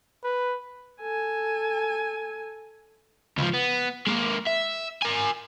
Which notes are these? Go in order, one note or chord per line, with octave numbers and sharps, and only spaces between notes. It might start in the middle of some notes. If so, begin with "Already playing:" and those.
B4
A4 G#5
C#2 F3
B3
G#3 A#3
E5
A#4 G#5